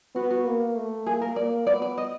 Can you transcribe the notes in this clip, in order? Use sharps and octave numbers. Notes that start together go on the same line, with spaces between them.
B3 F#4
F#4
A#3
A3
A#3 G#4
A#4
A#3 D5
B3 D5
D5
D#5